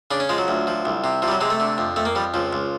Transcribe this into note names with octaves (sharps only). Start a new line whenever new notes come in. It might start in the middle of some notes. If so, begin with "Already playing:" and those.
C#3 D4
C#4
F3 G#3
F#3
D2
F3
C2
C3
C3 F3
G3
F#3
C3 G#3
A3
D3
F2
F2 A3
A#3
F2 G3
C#2 F3
C#2